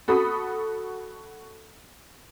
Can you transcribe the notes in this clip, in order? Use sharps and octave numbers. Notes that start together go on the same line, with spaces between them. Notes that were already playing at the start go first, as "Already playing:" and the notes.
F#4 A4 B5 D#6